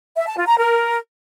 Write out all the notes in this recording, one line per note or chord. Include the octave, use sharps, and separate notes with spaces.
E5
A5
F4
A#5
A#4